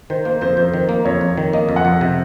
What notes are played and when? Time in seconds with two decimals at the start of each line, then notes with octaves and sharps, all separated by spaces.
0.10 D#3 C5
0.25 A#3 C5
0.41 F2 C5
0.57 F2 C5
0.74 D#3
0.89 A#3
1.05 F2 C#5
1.21 F2
1.38 D#3
1.53 A#3 D#5
1.69 F2
1.76 F#5
1.85 F2
2.01 C3